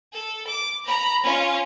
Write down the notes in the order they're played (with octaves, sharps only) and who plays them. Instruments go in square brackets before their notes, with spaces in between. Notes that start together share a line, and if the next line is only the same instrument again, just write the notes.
[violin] A4
D6
A#5 B5
C#4 F4